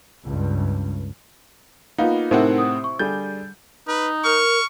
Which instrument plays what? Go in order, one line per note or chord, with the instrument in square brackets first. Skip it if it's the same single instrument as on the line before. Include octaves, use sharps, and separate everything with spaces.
[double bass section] C#2 G2
[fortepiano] A#3 B3 [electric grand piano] D#4 [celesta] F4 F5
[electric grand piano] A2 C4 F#5 [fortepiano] C3 E4 C5 [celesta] D#4 A#4
[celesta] D#6
C#6
[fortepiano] D3 G3 G#4 [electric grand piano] G6 [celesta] A6
[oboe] D#4 [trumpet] B4
[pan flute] A#4 [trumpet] C#6 [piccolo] F6